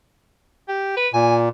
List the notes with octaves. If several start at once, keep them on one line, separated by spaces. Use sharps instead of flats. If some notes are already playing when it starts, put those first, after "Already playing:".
G4
B4
A#2 G#5